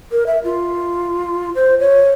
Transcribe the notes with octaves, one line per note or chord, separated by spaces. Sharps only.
A#4
E5
F4
C5
C#5